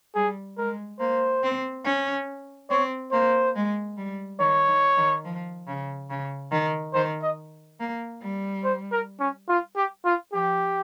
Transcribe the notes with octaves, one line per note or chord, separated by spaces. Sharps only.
G3 G#4
G#3 A#4
A#3 C5
C4
C#4
C4 C#5
A#3 C5
G#3
G3
D#3 C#5
D#3
D#3
F3
C#3
C#3
D#3
D#3 C5
D#5
A#3
G3
C5
A#4
C#4
F4
G4
F4
F3 G4